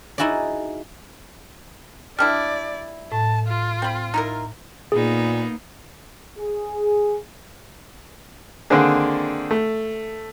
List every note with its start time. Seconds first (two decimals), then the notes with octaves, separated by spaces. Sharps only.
0.18 D#4 E4 F#4 G#4 D5
2.19 G3 D4 E4 D5 F6
3.12 A2 A5
3.48 F4
3.82 C4 B5
4.14 D#4 E4 A#4
4.92 A#2 A#3 B3 D#4 G#4
6.38 G#4
8.70 D3 D#3 A#3 C4 D4 G#4
9.51 A3